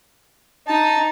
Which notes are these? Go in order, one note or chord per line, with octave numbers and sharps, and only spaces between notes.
D#4 A5